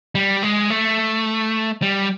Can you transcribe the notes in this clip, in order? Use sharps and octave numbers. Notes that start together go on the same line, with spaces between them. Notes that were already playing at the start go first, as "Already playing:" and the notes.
G3
G#3
A3
G3